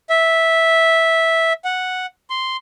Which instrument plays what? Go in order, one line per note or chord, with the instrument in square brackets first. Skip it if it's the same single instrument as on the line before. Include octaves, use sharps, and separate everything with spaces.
[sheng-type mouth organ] E5
F#5
C6